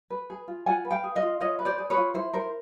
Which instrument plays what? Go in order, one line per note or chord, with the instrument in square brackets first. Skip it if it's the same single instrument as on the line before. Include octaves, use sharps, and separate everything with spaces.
[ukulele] B4
G#4
F4
F4 F#5 G#5
B4
F5 G5
G#4
D#5 F5
F4
F4 C#5 D#5
B4
C5 D5
G#4
B4 C#5
F4
E4 C5
A#4 C5